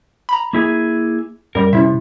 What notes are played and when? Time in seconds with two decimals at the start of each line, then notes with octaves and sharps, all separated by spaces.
0.29 A#5 B5
0.53 A#3 E4 G#4
1.55 F#2 G3 A#4
1.73 C3 C#4 E4 E5